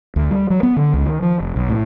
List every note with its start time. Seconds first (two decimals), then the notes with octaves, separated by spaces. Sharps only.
0.16 D2
0.31 G3
0.50 F#3
0.63 B3
0.76 D3
0.94 C#2
1.06 D#3
1.22 F3
1.40 F1
1.56 B1
1.70 A2